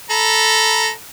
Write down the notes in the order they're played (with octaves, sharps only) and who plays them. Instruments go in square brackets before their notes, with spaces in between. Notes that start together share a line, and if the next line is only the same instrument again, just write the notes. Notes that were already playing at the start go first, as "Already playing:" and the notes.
[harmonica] A4 A#5 B5